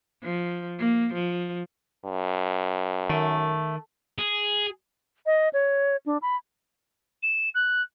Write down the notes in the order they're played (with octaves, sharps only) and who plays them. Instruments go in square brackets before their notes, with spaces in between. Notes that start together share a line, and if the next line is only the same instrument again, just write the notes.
[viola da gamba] F3
A#3
F3
[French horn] F#2
[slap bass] D#3 [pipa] A3
[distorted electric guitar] G#4
[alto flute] D#5
C#5
D4
B5
[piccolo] E7
F#6